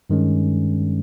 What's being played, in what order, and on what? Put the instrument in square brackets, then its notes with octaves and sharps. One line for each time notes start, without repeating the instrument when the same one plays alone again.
[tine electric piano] G2 D#3 G#3 C#4